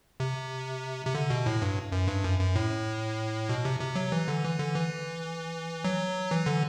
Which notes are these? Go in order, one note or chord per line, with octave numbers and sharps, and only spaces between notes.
C3
C3
D3
B2
A2
G2
F#2
G2
F#2
F#2
A2
B2
C3
C3
F#3
E3
D3
E3
D3
E3
F#3
E3
D3